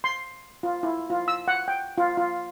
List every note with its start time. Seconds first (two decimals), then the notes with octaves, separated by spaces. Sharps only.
0.04 C6
0.63 F4
0.83 E4
1.10 F4
1.28 E6
1.48 F#5
1.68 G5
1.98 F4
2.17 F4